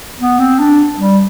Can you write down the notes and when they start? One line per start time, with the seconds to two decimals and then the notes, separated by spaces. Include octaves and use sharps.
0.19 B3
0.39 C4
0.60 D4
0.99 G3